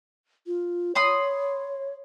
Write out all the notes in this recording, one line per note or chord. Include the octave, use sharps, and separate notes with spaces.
F4
C#5 B5 C6 D#6